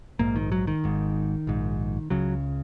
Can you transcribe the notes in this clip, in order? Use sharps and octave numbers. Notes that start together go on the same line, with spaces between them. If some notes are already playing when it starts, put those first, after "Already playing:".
A#1 G#2 A#3
D#3
F#3
D#3
G#1 G#2
A#1 G#2
C#2 C#3 F#3